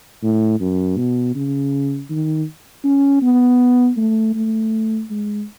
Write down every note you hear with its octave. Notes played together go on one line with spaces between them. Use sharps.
A2
F#2
B2
C#3
D#3
C#4
B3
A3
A3
G#3